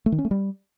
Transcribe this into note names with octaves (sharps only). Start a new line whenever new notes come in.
A3
D#3
C#4
A3
G3